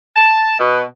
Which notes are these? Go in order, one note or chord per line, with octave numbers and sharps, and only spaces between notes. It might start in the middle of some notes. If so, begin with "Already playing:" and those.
A5
B2